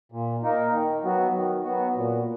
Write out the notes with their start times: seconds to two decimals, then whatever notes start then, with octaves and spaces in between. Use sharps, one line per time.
0.12 A#2
0.43 A#3 D#4 A#4
0.73 D#3
1.03 F#3 B3 F#4
1.35 D#3
1.64 F#3 B3 F#4
1.95 A#2